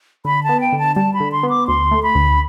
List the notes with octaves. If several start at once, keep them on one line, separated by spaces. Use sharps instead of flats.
D3 B5
A5
B3
G5
D3
A5
G3 A5
B5
D3
C6
B3
D6
D2 C6
A3
B5
D2